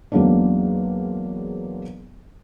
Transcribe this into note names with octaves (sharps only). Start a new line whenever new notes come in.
E2 F#3 G#3 A#3 C#4 D4